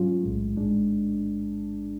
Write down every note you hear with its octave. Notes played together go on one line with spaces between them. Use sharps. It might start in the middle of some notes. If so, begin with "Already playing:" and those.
Already playing: G#2 F#3 C#4 F4
B1 A2 G#3
A1 G#2 G#3 D4